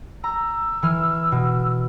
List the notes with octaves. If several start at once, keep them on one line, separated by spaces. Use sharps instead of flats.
A#5 E6
E3 F6
B2